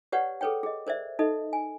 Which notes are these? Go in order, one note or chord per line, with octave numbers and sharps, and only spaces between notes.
G4 B4 C#5 D5 F#5
G#4 A4 B4 C#5 G5
G#4 D#5
A#4 C5 D5 E5
D#4 A4 D#5
G#5